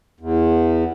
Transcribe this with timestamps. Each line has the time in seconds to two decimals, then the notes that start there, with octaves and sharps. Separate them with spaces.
0.20 E2